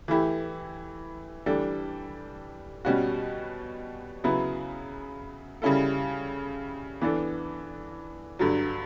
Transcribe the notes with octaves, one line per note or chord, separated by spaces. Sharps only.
E3 A3 E4 G4
E3 G3 D4 A4
B2 G3 C#4 F#4
C#3 F#3 B3 E4
C#3 G3 C#4 E4 A4
E3 B3 D4 A4
G2 D3 F#3